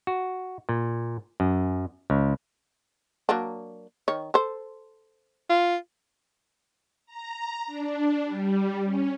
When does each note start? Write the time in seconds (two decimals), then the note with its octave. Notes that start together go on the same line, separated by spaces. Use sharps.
0.07 F#4
0.69 A#2
1.40 F#2
2.10 C#2
3.29 F#3 A#3 D4
4.08 D#3 C#5
4.34 A4 C5
5.50 F4
7.06 A#5
7.67 D4
8.24 G3
8.84 C#4